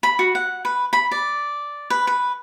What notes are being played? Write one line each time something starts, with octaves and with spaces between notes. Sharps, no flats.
B5
F#4
F#5
B4
B5
D5
B4
B4